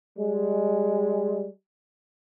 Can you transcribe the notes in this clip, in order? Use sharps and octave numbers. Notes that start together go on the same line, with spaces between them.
G3 G#3